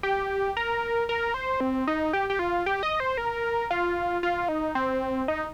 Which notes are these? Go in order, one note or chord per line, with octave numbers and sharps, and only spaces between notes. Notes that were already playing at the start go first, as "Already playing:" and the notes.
G4
A#4
A#4
C5
C4
D#4
G4
G4
F4
G4
D#5
C5
A#4
F4
F4
D#4
C4
D#4